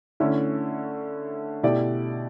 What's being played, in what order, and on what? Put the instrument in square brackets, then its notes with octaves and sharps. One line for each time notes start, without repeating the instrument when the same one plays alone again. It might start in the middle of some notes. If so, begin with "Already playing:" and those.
[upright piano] D3 A3 C#4 E4
B2 A3 E4 G4 D5